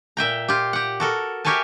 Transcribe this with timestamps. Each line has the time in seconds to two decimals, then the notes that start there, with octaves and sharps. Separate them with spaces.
0.17 A#2 E5 G5 A#5
0.49 F4 G4
0.73 G4 F#5
1.00 F#4 A4 A#4
1.44 G4 A#4 C#5 E5 G#5 A5